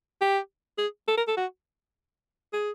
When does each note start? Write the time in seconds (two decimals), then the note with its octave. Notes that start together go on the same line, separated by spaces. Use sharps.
0.21 G4
0.78 G#4
1.08 A4
1.17 A#4
1.28 A4
1.37 F#4
2.53 G#4